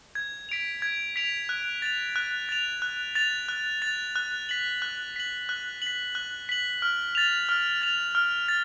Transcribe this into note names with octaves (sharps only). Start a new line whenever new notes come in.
G#6
B6 D7 F7
G#6
B6 D7 F7
F#6
A6 F7
F#6
A6 F7
F#6
A6 F7
F#6
A6 F7
F#6
B6 F#7
F#6
B6 F#7
F#6
B6 F#7
F#6
B6 F#7
F6
A6 F7
F6
A6 F7
F6
A6